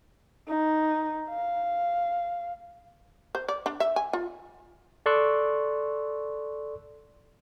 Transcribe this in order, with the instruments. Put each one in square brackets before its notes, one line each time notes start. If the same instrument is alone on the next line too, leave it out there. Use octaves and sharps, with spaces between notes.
[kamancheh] D#4
F5
[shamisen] C5
D5
D4
E5
G#5
F4
[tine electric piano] A4 D5 C6 C#6 E6 F#6